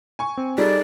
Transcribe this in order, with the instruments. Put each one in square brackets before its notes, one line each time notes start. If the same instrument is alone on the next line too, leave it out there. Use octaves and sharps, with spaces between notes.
[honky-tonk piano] G#5 C#6
[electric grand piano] C4
[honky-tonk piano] G3 [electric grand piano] D#4 G#4 A4 [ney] D5